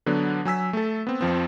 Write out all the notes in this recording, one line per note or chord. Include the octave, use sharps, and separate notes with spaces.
D3 F#3 B3 D4
F#3 G#5 E6 B6
A3 A4
B3 C4
F2 F3 C4